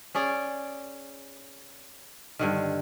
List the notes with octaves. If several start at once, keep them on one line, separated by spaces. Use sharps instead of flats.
C#4 G#4 D5
G2 D3 D#3